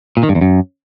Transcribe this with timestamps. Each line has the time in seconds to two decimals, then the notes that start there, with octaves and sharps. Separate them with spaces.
0.17 A#2
0.23 D#3
0.29 G2
0.35 E2
0.41 F#2